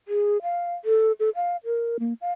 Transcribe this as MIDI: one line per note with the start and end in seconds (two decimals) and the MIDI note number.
0.08 0.42 68
0.42 0.75 77
0.85 1.12 69
1.20 1.30 69
1.35 1.57 77
1.65 1.97 70
2.00 2.13 58
2.21 2.32 77